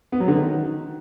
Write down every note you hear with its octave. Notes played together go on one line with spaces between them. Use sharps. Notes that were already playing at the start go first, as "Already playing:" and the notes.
B3
F#3
D3
D#3